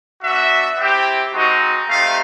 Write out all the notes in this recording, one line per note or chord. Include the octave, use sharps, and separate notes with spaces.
B3 D4 F#4 E5
C4 E4 G4
G#3 C4 D#4 F#4
A3 C4 D#4 G4 F5